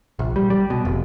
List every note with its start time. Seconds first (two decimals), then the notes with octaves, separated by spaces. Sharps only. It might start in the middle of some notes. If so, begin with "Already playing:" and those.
0.19 A#1
0.36 G3
0.50 G3
0.70 B2
0.85 F1